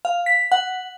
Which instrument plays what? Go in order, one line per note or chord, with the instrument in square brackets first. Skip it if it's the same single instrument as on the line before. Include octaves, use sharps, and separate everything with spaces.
[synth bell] F5
B6
F#5